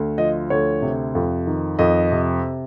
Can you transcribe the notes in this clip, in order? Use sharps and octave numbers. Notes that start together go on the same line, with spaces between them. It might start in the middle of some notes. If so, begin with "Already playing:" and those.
Already playing: D2
F3 D#5
D2 C#5
C3
F2
D#3
F2 D#5
C3